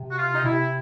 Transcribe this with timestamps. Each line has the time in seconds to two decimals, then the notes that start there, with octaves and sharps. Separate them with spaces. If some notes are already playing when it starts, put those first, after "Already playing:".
Already playing: C3
0.10 F#4
0.17 F4
0.33 D#4
0.44 C3 E4